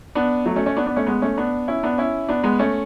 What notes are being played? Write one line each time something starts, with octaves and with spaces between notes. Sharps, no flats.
B3 D4
F#3 A3
A3 C#4
A3 C#4
B3 D4
B3 D4
A3 C#4
G#3 B3
A3 C#4
B3 D4
C#4 E4
B3 D4
C#4 E4
B3 D4
G#3 B3
A3 C#4